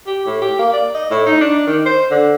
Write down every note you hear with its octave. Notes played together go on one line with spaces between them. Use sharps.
G4
A2
G4
A#3
D5
D#5
A2
D#4
D4
D#3
C5
D3